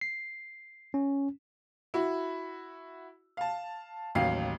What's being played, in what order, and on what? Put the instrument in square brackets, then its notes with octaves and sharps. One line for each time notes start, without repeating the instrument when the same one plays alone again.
[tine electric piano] C7
C#4
[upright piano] E4 F#4
F5 A5
A1 D#2 F#3 F5 C7